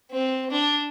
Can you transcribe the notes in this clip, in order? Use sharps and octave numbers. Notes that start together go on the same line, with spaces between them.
C4
D4